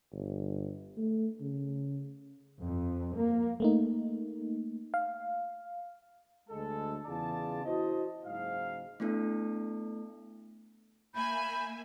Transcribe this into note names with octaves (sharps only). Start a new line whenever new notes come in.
G1
A3
C#3
F2
A#3
A3 A#3 D#4
F5
D2 G#3 A4
E2 C#3 F4 G#4 D5 A5
E4 F#4 C5 D#5
F#1 G#2 F5
A3 B3 D4 E4 A4
A#3 E5 G#5 B5 G6